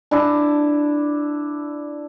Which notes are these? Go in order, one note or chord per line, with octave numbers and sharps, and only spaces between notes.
D4 E4 A5